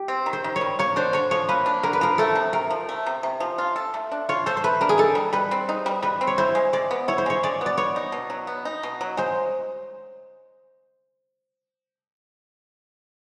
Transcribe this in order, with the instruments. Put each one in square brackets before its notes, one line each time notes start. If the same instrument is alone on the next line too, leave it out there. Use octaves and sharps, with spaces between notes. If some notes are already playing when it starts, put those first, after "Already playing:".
Already playing: [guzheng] G4
[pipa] C4
D#3
[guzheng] C5
[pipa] D#3
[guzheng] C#5
[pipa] G3
[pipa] A#3 [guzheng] C#5
[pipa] D4 [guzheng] C5
[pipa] D3 [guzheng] C#5
[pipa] F3 [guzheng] C#5
[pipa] A#3 [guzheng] B4
[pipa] D4
[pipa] D3 [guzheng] A#4
[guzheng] B4
[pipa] F3 [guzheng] A#4
[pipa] A3 [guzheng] A4
[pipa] C3
[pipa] C3 [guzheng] A#4
[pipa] F3
A3
C3
C3
F3
F4
A4
A3
D4
[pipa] F4 [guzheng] C#5
[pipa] A4 [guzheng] C5
[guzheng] C5
[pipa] A3 [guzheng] B4
[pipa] D4 [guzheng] A#4
[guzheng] G#4
[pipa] D#4 [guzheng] A4
[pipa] G3
[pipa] G3 [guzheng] B4
[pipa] C4
D#4
G3
[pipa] G3 [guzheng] B4
[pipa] C4
[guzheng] C#5
[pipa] E4 [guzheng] C5
[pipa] G#3
[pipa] G#3 [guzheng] D5
[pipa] B3
[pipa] E4 [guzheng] C#5
[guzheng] C5
[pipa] G#3 [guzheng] C#5
[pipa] G#3 [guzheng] D5
[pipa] B3 [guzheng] D5
[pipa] B3 [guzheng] C#5
[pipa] D#4
B2
F#3
B3
D#4
B2
F#3
[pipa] G#3 [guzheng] C5